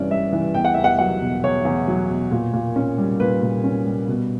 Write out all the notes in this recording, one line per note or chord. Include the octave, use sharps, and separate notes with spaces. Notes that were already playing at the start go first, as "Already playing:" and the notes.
Already playing: G2 E3 G3 C#4 D5
G3 E5
E3
E2 G5
F#5
E2 E5
F#5
F#3 F#5
B2
E2 C#5
E2
F#3
B2
A#2
A#2
C#4
G3
A#2 B4
A#2
C#4
G3
B2